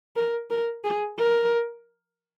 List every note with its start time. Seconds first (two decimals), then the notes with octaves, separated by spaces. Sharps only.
0.16 A#4
0.50 A#4
0.84 G#4
1.18 A#4